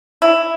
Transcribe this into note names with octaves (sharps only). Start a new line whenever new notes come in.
E4